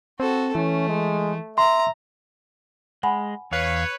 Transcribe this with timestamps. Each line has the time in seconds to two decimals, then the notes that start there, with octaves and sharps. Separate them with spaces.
0.20 C4 F#4 A4
0.55 E3 A3 C#4
0.88 G#3
1.58 E5 A#5 C6
3.03 G#3 F#5 G#5 B5
3.51 E2 B4 C#5 F5